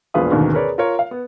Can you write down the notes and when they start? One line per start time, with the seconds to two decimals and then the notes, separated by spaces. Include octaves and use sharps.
0.14 E1 A#1 F4 B4 F5 D#6
0.31 A1 D#2 G#2 B2 D3 D#3
0.53 G#4 A#4 B4 C#5 D5
0.78 F4 A#4 C#5
0.99 F5
1.11 B3